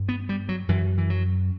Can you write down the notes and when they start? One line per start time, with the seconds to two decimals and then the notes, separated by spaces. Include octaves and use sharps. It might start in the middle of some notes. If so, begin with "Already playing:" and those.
Already playing: G2
0.09 B3
0.29 G3
0.49 F#3
0.69 F#2 E3
0.98 E3
1.10 F#3